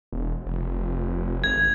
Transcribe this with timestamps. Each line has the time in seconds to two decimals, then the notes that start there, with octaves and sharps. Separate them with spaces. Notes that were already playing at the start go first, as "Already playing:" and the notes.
0.12 E1
0.46 F1
1.44 G#1 G#6